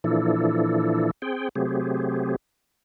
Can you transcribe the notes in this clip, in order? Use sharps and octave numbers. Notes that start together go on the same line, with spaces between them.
A#2 E3 F3 D4 E4 A4
C4 G#4 G5
C3 F#3 A3 C4 G4 G#4